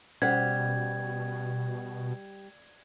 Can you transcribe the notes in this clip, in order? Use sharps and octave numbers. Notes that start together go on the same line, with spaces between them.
B2 G3 C#4 C5 F#5 G#6